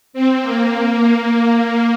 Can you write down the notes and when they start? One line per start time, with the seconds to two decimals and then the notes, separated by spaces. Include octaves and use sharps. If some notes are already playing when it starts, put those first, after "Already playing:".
0.13 C4
0.42 A#3